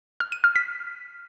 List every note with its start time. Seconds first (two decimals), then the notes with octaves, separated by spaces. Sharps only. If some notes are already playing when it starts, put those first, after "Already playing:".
0.20 F6
0.32 D#7
0.44 F6
0.56 B6